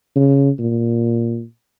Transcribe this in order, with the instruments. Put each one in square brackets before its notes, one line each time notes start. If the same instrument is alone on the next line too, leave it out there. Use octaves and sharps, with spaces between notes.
[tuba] C#3
A#2